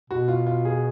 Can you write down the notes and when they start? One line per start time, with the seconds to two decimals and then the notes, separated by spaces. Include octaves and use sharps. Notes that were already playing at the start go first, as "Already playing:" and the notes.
0.10 B2 F#4
0.28 F4
0.47 F4
0.65 G#4